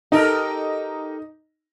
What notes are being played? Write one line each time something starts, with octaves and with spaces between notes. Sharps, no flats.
D#4 G4 A4 A#4